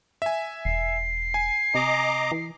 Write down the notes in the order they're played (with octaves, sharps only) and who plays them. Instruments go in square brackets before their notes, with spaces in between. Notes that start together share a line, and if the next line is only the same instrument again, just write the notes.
[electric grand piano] E5 G#5
[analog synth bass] E1 [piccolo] C7
[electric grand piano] G#5
[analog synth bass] C3 [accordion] D#5 A#5 D6
[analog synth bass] E3